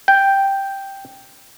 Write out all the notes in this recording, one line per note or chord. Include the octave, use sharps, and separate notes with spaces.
G5